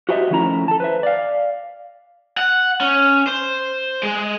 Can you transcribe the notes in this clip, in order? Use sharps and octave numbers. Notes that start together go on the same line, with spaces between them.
F#4 G4 C5 D#5 E5
D#3 F3 A3 C#4 E4 A#5
A4 A5
B4 C5 E5
D5 F5
F#5
C#4
C5
G#3